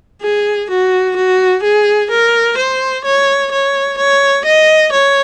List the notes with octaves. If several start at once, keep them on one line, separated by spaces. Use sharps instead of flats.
G#4
F#4
F#4
G#4
A#4
C5
C#5
C#5
C#5
D#5
C#5